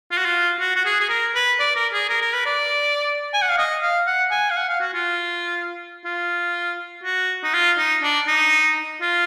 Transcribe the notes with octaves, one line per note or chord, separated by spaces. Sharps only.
F4
F#4
F4
F#4
F#4
G#4
G#4
A#4
B4
D5
A#4
G#4
A#4
A#4
B4
D5
G#5
F#5
F5
D#5
F5
F#5
G#5
F5
F#5
F5
F#4
F4
F4
F#4
D#4
F4
D#4
D4
D#4
F4